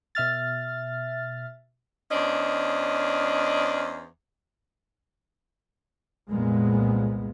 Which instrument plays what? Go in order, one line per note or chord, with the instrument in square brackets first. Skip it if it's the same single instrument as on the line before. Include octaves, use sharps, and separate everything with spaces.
[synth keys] B2 E5 F6 A6
[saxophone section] E2 C#4 D4 C5 D#5
[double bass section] C2 F2 A#2 G#3 B3